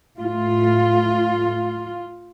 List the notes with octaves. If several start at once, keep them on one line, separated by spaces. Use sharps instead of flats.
A2 A3 F4